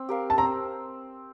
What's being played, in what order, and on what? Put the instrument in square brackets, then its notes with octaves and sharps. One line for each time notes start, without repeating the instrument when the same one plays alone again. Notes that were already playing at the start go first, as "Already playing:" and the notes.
Already playing: [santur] C4
G4 A#4 F5
[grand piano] A5
[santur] C4 [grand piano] A#5